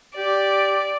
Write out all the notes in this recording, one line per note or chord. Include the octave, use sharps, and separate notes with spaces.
G4 D5